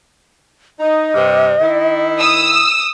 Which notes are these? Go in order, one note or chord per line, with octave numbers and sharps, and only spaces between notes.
D#4 D#5
G2 C3
D#3 E4
D#6 E6